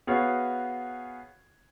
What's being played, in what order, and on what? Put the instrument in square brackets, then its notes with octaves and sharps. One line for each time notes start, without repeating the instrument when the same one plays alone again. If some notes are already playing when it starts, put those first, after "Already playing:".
[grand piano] B3 F#4 G#4 C#5 F5